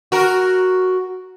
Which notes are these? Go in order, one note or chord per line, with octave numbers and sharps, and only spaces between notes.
F#4 A#4